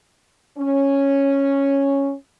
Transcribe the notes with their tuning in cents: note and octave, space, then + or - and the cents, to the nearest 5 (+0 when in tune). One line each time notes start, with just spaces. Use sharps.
C#4 -5